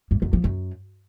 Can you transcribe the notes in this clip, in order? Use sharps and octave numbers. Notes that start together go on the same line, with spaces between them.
G2
F#2
F3
F#2